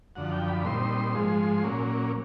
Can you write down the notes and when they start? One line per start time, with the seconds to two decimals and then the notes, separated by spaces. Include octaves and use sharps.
0.15 F#2 D3 F3 F#5
0.32 G5
0.48 B5
0.65 A#2 G3 C4 D#4 C6
1.15 G#2 F3 G#3
1.63 A#2 F#3 A#3 C#4